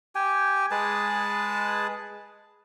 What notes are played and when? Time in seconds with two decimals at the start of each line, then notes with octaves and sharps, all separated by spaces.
0.15 G4 G5 G#5
0.71 G#3 G#4 B4 A5